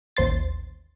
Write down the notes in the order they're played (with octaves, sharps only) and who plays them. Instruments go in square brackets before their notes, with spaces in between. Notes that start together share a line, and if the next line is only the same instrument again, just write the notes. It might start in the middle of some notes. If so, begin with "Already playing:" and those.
[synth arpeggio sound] A1 D#2 C5 C6 A6